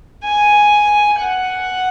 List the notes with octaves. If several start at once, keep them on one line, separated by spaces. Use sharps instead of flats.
G#5
F#5